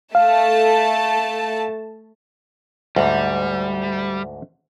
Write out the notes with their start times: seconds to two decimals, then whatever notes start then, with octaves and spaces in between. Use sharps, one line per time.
0.15 A3 F5 A5
2.96 D2 G#2 G3